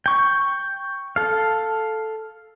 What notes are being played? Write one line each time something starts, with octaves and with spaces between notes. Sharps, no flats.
G5 C#6
A4 F5